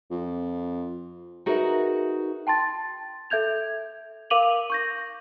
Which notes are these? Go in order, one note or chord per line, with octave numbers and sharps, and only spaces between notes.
F2
D#4 F#4 G#4 A#4 B4 E5
G5 A5 C6 A6
A4 E5 G6 G#6 F7
A#4 F5 D6 D#7 F7 F#7
C#6 G6 A#6